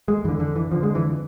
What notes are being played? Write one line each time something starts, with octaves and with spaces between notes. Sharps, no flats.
G#3
F2 D3 E3
D3
E3
F2 D3 F3
G#3
E3